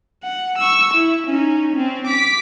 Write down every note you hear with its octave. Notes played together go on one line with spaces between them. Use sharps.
F#5
C#6 E6
E4
C#4 D#4
C4 C#4
D6 B6